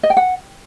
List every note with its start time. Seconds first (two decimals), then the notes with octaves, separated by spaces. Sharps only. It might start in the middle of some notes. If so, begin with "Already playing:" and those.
0.03 D#5
0.10 G5
0.17 F#5